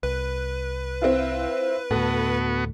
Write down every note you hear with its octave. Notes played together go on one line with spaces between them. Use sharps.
C2 B4
C4 E4 F4
D2 A2 B3 F#4 A4